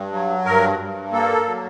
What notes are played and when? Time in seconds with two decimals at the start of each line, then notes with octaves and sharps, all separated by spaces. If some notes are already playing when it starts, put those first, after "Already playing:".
Already playing: G2
0.13 F#3
0.45 G2 A#4
0.79 G2
1.12 A#3 A4
1.46 F#3